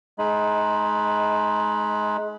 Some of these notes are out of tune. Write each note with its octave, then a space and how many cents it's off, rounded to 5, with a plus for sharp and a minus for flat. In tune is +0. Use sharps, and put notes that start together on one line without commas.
G#3 +25 D#4 +5 B5 -5